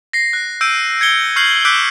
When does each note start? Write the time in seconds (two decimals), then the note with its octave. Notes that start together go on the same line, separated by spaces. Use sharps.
0.13 A#6 C7
0.33 F#6
0.61 E6 G6 D7 D#7
1.01 G#6 C#7 G7
1.36 C#6 F6 G6 C7 F#7
1.65 D6 E6 F#6 G6 B6 D7